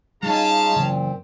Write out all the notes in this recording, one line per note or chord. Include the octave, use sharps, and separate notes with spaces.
G3 C#4 D#4 F4 G#4 F5 A5
F#2 A#2 C#3 E3 C4